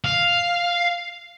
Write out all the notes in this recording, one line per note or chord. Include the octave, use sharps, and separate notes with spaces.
F5